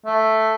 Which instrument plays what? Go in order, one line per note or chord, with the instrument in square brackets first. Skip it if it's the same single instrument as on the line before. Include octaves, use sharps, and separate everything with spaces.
[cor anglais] A3